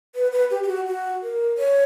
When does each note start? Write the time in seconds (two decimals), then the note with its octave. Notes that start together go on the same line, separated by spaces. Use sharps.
0.15 B4
0.32 B4
0.50 G4
0.63 G4
0.68 F#4
0.86 F#4
1.23 A#4
1.58 C#5